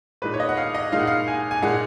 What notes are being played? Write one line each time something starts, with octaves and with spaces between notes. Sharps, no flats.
A#2 G#3 D#4 B4
C#5
D#5
F#5
F5
D#5
A#2 G#3 D#4 F5
F#5
F5
G#5
G#5
A#2 G#3 D#4 F#5